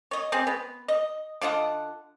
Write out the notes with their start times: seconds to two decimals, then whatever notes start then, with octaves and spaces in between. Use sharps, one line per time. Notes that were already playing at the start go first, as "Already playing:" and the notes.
0.11 C#5 D#5
0.32 C4 G#4
0.47 B3
0.88 D#5
1.41 D3 F4 D#5 F#5